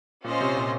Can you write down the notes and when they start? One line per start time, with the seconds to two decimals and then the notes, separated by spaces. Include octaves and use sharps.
0.24 A#2 C#4 F4 C5 D#5
0.40 C3
0.56 A#2